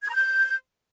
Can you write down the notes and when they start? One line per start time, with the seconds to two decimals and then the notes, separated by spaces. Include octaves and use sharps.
0.03 G#6
0.09 A#5
0.14 G6